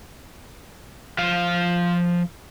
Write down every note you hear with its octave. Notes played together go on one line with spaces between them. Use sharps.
F3 F5